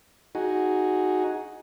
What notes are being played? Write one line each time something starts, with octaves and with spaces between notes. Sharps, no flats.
D#4 F#4 G#4